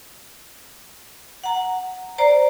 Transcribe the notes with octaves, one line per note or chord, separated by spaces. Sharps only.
F#5 A#5
C5 D5 A#5